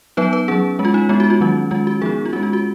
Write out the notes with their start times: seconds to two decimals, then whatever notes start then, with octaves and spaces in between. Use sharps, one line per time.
0.17 F#3 B3 D#4 B4
0.33 B4
0.48 F#3 C#4 G#4
0.79 G#3 C#4
0.85 F4
0.94 D#4
1.09 G#3 B3 D#4 F4
1.20 F#4
1.30 F4
1.40 D#3 F#3 C#4
1.71 D#3 G#3 C#4 F4
1.87 F#4
2.01 F3 B3 D#4 G#4
2.25 F4
2.33 C#4 F#4
2.36 G#3
2.43 F4
2.53 F#4